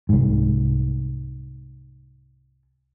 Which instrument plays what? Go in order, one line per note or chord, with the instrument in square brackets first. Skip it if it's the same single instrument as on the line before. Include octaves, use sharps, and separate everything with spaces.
[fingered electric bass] C2 G#2